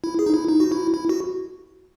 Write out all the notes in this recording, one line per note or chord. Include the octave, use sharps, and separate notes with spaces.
E4
G#4
D#4
E4
D#4
F#4
E4
E4
F#4